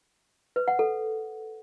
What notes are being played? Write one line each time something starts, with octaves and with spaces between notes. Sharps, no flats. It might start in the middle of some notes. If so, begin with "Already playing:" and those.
B4
F#5
A4